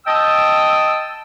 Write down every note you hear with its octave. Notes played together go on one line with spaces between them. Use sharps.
D#5 G5 A5 E6